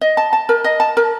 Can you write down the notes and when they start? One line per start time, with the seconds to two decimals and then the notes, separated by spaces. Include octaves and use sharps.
0.01 D#5
0.17 A5
0.33 A5
0.49 A#4
0.64 D#5
0.80 A5
0.97 A#4